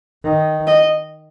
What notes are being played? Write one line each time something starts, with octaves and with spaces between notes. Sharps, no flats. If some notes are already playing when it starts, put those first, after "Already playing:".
D#3
D#5